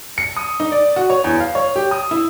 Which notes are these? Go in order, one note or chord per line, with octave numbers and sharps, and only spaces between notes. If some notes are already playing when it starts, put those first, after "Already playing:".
C#7
D#6
D#4
D5
F#4
C#5
E2
F5
C#5
G4
D#6
E4